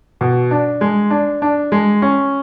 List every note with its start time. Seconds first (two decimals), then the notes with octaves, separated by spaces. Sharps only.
0.21 B2
0.51 D4
0.81 G#3
1.10 D4
1.42 D4
1.72 G#3
2.02 C#4